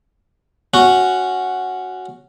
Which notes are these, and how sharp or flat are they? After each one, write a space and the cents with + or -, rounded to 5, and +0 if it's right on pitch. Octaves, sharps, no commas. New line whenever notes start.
C#4 +0 F#4 +0